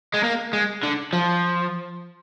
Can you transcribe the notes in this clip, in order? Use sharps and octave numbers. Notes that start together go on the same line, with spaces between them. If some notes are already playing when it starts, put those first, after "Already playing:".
G#3
A#3
G#3
D3
F3